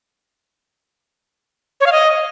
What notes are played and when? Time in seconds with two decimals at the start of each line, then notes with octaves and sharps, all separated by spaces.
1.81 C#5
1.86 F5
1.92 D#5